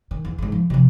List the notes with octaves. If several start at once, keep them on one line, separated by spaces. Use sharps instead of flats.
D#3
E2
G#2 D3
F3
C3 F3